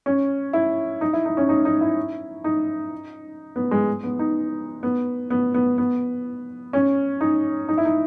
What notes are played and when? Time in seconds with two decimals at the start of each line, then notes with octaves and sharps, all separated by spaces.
0.06 C#4
0.53 E4
1.01 D#4
1.13 E4
1.25 D#4
1.37 C#4
1.49 D#4
1.65 D#4
1.81 E4
2.44 D#4
3.56 B3
3.71 G#3
4.04 B3
4.19 D#4
4.83 B3
5.30 B3
5.54 B3
5.78 B3
6.73 C#4
7.21 D#4
7.69 D#4
7.78 E4
7.85 D#4